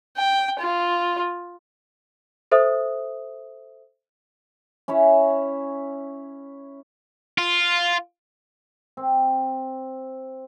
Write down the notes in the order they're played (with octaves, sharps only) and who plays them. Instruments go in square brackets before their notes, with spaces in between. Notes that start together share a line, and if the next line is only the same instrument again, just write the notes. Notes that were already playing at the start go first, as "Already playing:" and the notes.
[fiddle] G5
F4
[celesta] A4 C5 E5 D#6
[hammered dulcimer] C#4 E4 C#5 E5
[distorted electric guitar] F4
[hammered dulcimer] C4